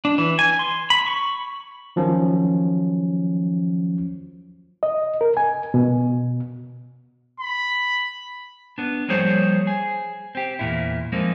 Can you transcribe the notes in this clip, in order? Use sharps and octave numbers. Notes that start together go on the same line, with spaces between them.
D4
E3
G#5
C6
B5
C#6
D#3 F3 F#3 C#4
D#5
A#4
G#5
B2
B5
B3 D4
F3 G3 A#3 G#4 C5 C#5
G#4
C4 G4
E2 A#2 E4
F3 G#3 A#3 C4 D#4